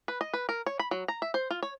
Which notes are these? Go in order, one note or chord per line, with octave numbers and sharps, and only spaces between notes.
B4
D#5
B4
A#4
C#5
B5
F#3
A#5
E5
C5
F4
C#5